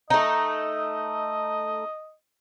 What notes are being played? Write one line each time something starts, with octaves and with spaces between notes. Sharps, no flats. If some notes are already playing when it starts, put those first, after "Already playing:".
A3 D#4 D#5